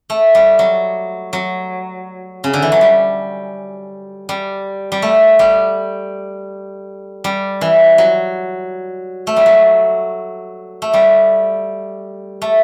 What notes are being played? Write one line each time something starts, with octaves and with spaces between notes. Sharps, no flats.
A3
G3
F#3
F#3
C#3
D3
E3
F#3
G3
G3
G3
A3
G3
G3
E3
F#3
A3
G3
F#3
A3
G3
A3